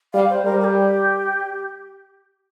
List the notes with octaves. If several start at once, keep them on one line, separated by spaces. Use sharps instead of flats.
G3 F5
C5
G3 A#4
A#4
G4